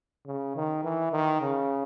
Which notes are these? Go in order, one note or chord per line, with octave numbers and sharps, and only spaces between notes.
C#3
D#3
E3
D#3
C#3